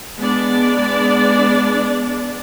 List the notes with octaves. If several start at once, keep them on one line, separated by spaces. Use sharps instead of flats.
G#3 B3 D4 D5